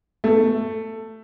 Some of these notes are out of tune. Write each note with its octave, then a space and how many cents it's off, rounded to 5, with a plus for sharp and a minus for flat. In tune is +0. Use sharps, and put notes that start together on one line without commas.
A3 +15